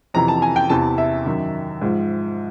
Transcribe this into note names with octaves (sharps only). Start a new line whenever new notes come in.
F2 C3 E3 A#5
A5
G#5
G5
E2 C3 E3 A5
E5
F#2 D#3
G#2 F3